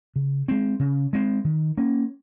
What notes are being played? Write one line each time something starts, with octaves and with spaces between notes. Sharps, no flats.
C#3
G#3 C4
C#3
G#3 C4
D#3
A#3 C#4